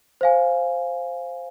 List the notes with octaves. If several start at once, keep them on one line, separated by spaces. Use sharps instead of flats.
C5 F5 G#5